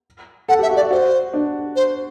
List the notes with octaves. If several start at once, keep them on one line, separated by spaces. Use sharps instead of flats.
A4 F#5
G4 E5
F#4
D5
F#4
F#4 C5
D4
C5